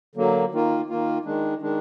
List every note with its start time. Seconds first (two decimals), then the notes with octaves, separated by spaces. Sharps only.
0.15 D3 F#3 A#3
0.52 D#3 A#3 F4
0.89 D#3 A#3 F4
1.25 D#3 G#3 D4
1.62 D#3 G#3 D4